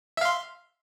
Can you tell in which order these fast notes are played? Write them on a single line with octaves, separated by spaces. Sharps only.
E5 F5 C6